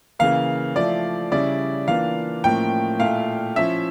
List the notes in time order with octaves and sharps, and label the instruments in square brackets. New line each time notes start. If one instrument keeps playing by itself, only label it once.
[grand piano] C#3 E3 A#3 [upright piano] F5
[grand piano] F3 A3 E4 [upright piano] D5
[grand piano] C#3 G3 C#4 E4 [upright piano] D5
[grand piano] E3 A#3 D4 F4 [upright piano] F5
[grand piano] A2 F3 A#3 C#4 [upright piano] G5
[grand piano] A#2 A3 E4 [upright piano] F5
[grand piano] F3 C#4 E4 [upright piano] E5